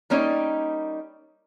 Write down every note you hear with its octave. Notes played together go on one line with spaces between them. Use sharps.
G3 A#3 C#4 D#4 D5 D#5